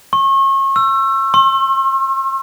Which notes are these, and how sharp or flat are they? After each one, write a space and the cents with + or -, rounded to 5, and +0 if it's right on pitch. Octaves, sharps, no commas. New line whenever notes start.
C#6 -35
E6 +25
C6 +45